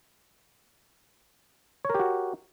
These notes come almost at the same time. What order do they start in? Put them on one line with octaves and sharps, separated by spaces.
C#5 A#4 G4 F#4